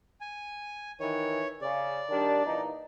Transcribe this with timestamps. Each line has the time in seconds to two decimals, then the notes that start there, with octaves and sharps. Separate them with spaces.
0.21 G#5
1.00 D#3 E3 C#5
1.62 C#3 D5
2.10 D#3 G3 D4
2.46 A#2 E3 D#4